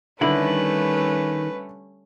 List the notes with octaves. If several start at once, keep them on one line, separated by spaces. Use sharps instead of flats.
D3 D#3 G3 A3 C#4 E4 B4 B5